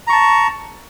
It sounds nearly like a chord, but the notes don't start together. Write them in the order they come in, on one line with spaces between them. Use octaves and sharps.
A#5 C#6 A5